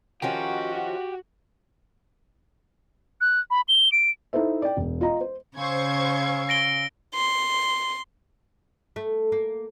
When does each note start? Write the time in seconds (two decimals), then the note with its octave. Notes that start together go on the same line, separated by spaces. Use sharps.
0.22 D#3 F3 C#4 F#4 G4
3.21 F#6
3.51 B5
3.68 G7
3.92 D7
4.33 D#4 E4 A4 C5 E5
4.62 D5 G5
4.77 E1
5.01 F4 D#5 A#5
5.21 C5
5.57 C#3 C5 F5 G#5 C#6 E6 G#6
6.49 A#6 D7 G7
7.14 C6
8.96 A3
9.32 A#3